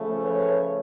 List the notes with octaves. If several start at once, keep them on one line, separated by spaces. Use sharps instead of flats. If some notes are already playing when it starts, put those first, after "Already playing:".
Already playing: C#3 F3 A3
B4 C#5